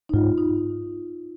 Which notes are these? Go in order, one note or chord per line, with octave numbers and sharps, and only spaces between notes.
D#4
G#2 F4
D#4